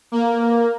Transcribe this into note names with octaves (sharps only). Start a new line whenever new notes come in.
A#3